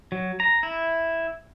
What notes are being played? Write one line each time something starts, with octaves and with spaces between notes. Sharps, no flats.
F#3
A#5
E4